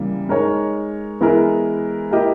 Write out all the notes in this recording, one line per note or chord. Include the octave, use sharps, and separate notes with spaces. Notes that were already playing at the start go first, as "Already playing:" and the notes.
Already playing: C#3 E3 G3 A#3
G#3 D#4 A#4 C#5
E3 G#3 B3 E4 A#4
A#3 E4 G4 A#4 D#5